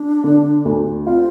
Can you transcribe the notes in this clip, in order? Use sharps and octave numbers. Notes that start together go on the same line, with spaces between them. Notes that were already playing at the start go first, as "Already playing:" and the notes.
Already playing: D4
D3
D2
C4 F4